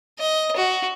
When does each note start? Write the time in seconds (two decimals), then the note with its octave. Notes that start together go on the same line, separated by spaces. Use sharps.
0.19 D#5
0.56 F#4